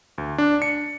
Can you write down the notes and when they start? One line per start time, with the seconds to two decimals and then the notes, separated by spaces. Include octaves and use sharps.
0.18 D2
0.38 D4
0.62 C#7